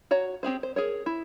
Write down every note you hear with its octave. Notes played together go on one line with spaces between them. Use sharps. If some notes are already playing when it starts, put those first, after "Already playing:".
F#4 C#5 A#5
C4 G4 G#4 C5
C5
G#4 A#4 C#5
E4